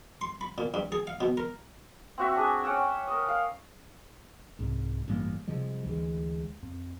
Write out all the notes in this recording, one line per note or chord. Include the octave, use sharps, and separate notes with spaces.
C6
B5
A#2
G2
G#4
F5
B2
A#4
C4 F#4 E5
D4 G#4
C#4 F#5 G5 E6
A#4 D#6
F5
C2 G#2
A1 G2 G3 A#3
C3 F3 G3 G#3
D2 E3 G#3
F2